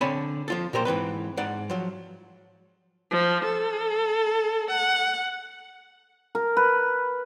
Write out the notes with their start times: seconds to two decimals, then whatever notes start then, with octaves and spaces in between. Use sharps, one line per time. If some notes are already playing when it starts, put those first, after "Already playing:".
0.01 D3 C4 C#5 G#5 A5 B5
0.48 F3 F4 A4
0.73 A#2 G4 A#4 C5
0.85 G#2 E3 C4 B4
1.37 G#2 D5 F#5
1.70 F3 F#3
3.11 F3
3.45 A4
4.70 F#5
6.35 A#4
6.57 B4